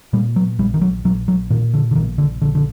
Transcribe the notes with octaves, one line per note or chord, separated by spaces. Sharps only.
A#2 G3
F#3
A#1 G3
D#3
F#3
A#1 F#3
F#3
A#2 D#3
D3
D3
A#1 D#3
D3
A#1 D3
D3